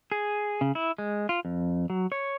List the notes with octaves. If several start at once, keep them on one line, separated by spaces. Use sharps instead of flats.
G#4
C#3
E4
G#3
F4
F2
F#3
C#5